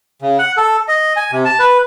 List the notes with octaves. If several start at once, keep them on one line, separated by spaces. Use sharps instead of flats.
C#3
F#5
A4
D#5
G#5
C3
A5
B4